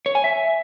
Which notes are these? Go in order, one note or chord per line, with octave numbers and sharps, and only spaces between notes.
C#5
G#5
E5